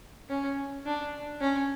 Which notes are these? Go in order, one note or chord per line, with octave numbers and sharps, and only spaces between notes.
C#4
D4
C#4